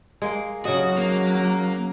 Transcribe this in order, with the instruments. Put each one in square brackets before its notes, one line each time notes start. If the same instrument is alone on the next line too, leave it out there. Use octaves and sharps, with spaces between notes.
[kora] G#3 A#3
[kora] C#3 D#5 [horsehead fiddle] F#3 [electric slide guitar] F#4
[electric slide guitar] A#3